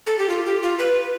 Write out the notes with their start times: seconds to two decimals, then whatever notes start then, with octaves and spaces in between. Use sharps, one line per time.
0.07 A4
0.19 G4
0.29 F4
0.46 G4
0.63 F4
0.79 B4